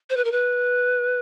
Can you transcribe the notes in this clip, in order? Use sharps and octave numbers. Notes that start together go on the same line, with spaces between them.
C5
B4
A#4
B4